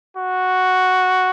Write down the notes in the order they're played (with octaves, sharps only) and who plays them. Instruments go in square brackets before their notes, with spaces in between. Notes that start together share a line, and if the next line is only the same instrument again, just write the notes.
[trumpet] F#4